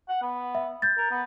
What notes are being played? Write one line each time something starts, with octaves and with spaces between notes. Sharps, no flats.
F#5
B3
E5
G6 A6
A#4
B3